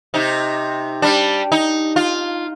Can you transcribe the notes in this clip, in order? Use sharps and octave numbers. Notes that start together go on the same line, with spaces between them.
C3 D#4
G3 D4
D#4
F4